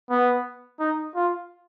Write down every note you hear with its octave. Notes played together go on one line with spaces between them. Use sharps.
B3
D#4
F4